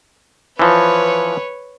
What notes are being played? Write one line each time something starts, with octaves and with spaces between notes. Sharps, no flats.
E3 F3 B4 C#5